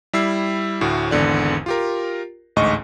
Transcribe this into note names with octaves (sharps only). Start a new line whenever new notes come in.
G3 E4 E6 C7
D2 A2 F#4
G#1 E2 D3 D5
F4 G4 A#4
A1 D2 G#2 D#5 C#6